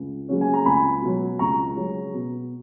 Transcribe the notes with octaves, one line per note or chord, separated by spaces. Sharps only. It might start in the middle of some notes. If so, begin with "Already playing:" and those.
Already playing: C#2
C#3 F#3 A#3 C#4
G#5
A#5
C#2 G#5 B5
B2 F#3
C#2 A#5 C#6
C#3 F#3 C#4
B2